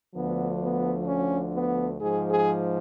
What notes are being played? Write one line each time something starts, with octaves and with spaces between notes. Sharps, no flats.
D2 D3 F3 B3
B3
C#4
B3
G#2 F3 G#4
G#4